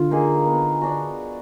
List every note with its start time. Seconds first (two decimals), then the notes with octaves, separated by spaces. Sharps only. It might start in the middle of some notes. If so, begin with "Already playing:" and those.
Already playing: D3 F4
0.11 A#3 D#4 G#4
0.46 B3
0.81 D4 F#4